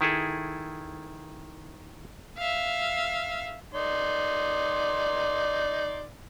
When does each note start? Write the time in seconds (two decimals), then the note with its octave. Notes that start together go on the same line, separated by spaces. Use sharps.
0.01 D#3 E4 G#4 A4
2.38 E5 F5
3.74 D#4 D5 C6